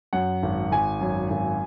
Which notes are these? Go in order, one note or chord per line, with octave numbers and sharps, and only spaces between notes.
F#2 F#5
G#1
G#1 G#5
F#2
G#1